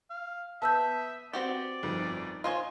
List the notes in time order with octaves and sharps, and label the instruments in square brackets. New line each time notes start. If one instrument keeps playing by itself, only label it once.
[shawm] F5
[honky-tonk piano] B3 [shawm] E5 [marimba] A5 E6 G6
[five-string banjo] C4 F#4 G4 [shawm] D5
[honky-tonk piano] G1 F2 D#3
[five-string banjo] F4 C5 C#5 [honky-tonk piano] D#5 G#5 C6